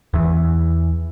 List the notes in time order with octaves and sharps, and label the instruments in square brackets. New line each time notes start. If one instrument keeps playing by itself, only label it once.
[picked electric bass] E2 E3